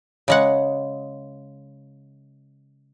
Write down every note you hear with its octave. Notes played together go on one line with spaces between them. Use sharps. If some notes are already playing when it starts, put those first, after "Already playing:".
C#3 G#3 F#5